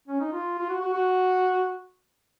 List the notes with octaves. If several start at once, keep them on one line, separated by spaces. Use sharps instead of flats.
C#4
D#4
F4
F4
F#4
F#4
F#4